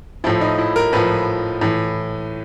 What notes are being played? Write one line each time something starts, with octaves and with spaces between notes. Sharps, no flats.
A2 F3 E4
D#4
E4
A#4
A2 F3 B4
A2 E3